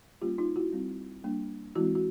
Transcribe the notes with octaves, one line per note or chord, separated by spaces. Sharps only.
G3 A#3 C#4 F4 G4
D#4 F4
E4 F#4
G3 C4
G3 A#3 D4
E3 G#3 C4 E4 F#4
F#4